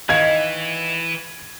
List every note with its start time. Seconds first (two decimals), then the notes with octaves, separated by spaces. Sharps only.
0.09 D#3 E3 D#5 F5 G#6